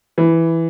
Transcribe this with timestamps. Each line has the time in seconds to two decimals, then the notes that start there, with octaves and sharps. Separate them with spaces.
0.18 E3